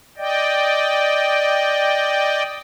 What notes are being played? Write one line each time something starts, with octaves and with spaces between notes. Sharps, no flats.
D5 D#5 G5